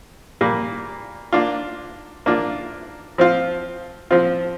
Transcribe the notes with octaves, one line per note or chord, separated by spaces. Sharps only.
A#2 G3 A#3
A#3 D4 F4
A#3 D4 F4
F3 C4 F4
F3 C4 F4